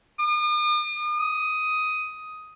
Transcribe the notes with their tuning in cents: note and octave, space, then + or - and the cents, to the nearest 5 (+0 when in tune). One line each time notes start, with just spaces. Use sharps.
D#6 -45
D#6 +10